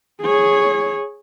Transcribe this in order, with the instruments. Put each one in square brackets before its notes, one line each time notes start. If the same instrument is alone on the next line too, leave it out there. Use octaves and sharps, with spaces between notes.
[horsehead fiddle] G#4 C#5